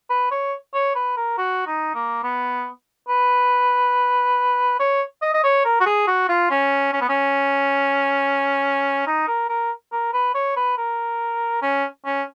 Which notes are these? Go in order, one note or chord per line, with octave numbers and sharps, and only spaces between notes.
B4
C#5
C#5
B4
A#4
F#4
D#4
A#3
B3
B4
C#5
D#5
D#5
C#5
A#4
F#4
G#4
F#4
F4
C#4
C#4
B3
C#4
D#4
A#4
A#4
A#4
B4
C#5
B4
A#4
C#4
C#4